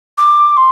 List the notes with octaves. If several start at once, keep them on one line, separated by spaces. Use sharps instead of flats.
D6
C6